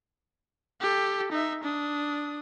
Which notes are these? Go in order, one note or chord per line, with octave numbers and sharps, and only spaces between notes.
G4 A4
D#4 E5
D4 D#6